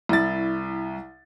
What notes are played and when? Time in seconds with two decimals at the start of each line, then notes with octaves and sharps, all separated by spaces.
0.09 C2 E4 A6